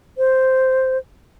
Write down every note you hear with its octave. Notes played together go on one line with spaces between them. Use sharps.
C5